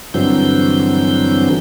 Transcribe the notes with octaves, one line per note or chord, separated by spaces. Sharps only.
G2 D3 E3 F#3 C4 G6